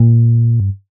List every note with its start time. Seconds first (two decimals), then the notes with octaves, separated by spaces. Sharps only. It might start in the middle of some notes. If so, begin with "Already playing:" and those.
Already playing: A#2
0.60 G2